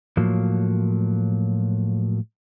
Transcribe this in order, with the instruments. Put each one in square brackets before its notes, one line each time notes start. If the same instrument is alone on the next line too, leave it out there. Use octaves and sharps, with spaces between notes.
[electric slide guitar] A2 F3 F#3 A#3